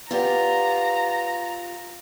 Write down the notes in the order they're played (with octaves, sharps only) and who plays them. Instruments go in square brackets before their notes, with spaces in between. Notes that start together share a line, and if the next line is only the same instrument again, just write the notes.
[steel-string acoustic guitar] F4 G4 [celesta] B4 D5 F#5 [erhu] A#5